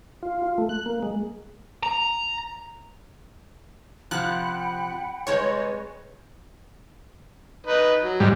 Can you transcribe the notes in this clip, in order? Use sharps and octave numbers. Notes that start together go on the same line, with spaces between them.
F4
F4
A3
F#6
A#3
G#3
A#5
C3 F3 F#5 G5 B5 F#6
C3 G3 G#3 B4 C#5 D#5
D#4 B4 D#5
F#3
G#2 G3